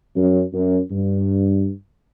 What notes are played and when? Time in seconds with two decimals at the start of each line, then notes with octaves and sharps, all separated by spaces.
0.16 F#2
0.53 F#2
0.91 G2